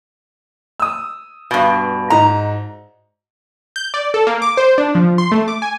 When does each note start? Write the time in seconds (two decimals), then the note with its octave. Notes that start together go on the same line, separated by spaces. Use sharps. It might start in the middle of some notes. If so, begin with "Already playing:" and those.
0.80 D#6 E6
1.51 G2 B2
2.10 G#2 D#4 A#5
3.76 G6
3.94 D5
4.14 A4
4.27 A#3
4.42 D6
4.57 C5
4.78 D4
4.95 F3
5.18 C6
5.32 A3
5.48 D6
5.62 G#5